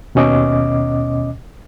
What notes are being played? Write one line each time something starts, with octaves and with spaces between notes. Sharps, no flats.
D#2 B2 C#4 D#5 D6